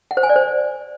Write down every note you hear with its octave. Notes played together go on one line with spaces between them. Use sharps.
F#5
C5
G#5
D5
C5